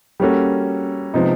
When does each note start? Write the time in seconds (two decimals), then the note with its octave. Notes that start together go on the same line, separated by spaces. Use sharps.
0.20 G3 A#3 C#4 F#4 A4
1.14 C3 F3 G#3 B3 D#4